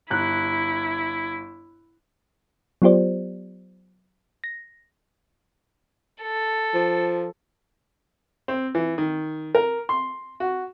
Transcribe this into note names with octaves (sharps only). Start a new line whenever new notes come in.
G1 E4 F#6
F#3 B3 F4 G4 C5 D5
A#6
A4
F3
C4
E3
D#3
A#4
C6
F#4